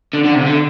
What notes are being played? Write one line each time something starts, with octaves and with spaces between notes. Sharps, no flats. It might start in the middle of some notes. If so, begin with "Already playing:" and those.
D3
D3
C3
D3